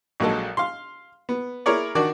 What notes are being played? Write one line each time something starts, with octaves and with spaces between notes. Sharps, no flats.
A#1 F#3 G#3 A4
F5 C6
B3
E4 G#4 A#4 C#5 D5
D#3 D4 F#4 D5